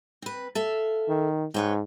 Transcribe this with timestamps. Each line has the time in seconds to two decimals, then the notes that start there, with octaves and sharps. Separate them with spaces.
0.22 C4 B4
0.55 A4 E5 F5
1.09 D#3
1.54 G#2 B4 C#5 G5